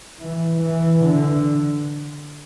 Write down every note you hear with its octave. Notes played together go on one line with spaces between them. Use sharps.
E3
E3
D3